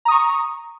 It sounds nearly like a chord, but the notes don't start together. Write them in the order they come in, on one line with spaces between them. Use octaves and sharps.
A#5 D#6 C#6